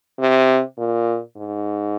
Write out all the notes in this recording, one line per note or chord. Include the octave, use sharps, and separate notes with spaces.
C3
A#2
G#2